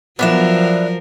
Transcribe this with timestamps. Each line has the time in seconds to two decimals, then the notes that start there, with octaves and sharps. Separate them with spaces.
0.19 F3 F#3 B3 D4 A#4 E5